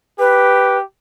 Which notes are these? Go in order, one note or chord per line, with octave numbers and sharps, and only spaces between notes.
G4 B4